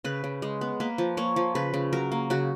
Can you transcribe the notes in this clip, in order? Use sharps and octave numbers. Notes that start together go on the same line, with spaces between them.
C#3 B4
C#3
G#3
B3
A#3 B4
F3
A#3 C#5
F3
C#3 B4
C#3
F#3 A#4
A#3
C#3 F#4